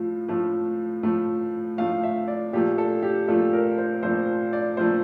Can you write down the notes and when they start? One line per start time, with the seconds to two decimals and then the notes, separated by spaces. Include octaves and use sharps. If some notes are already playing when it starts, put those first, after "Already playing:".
Already playing: A2 F3 A3
0.29 A2 F3 A3
1.03 A2 F3 A3
1.78 A2 F3 A3 F5
2.03 E5
2.28 D5
2.53 A#2 F3 A3 G4
2.78 A4
3.03 G4
3.28 A#2 F3 A3 A4
3.53 A#4
3.78 C5
4.03 A#2 F3 A3 C5
4.53 D5
4.77 A#2 F3 A3 C5